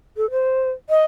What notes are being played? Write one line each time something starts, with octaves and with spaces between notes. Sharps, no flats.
A4
C5
D#5